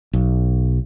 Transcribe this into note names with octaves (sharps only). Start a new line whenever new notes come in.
B1